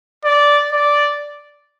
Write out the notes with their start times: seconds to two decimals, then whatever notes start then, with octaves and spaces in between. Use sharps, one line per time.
0.25 D5
0.72 D5